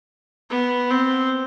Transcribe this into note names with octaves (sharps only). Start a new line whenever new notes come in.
B3
C4